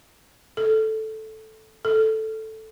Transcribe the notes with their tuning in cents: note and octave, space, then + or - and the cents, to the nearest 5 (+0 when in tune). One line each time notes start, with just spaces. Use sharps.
A4 -5
A4 +0